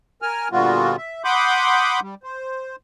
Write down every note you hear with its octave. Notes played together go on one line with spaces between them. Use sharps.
A#4 G#5 F6
A#2 D3 G3 B3 F4 F#4
E5
F#5 B5 C6 D6 D#6 G6
G3
C5